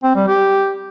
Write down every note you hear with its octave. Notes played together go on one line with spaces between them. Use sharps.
C4
G3
G4